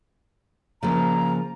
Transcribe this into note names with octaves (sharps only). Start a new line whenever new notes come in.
C#3 F3 A#3 A#5